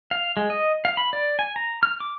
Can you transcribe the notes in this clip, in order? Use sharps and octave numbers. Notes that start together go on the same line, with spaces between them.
F5
G#3
D#5
F5
B5
D5
G#5
A#5
F6
D6